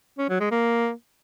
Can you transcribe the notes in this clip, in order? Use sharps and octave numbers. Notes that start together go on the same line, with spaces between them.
C#4
F#3
G#3
A#3